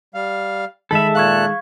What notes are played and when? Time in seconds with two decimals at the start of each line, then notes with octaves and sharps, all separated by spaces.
0.15 G3 F5
0.91 D#3 G#3 A4 E5 B5
1.15 A#2 F5 C#6 F#6 G#6